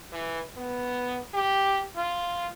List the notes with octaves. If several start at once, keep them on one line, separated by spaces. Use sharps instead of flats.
E3
B3
G4
F4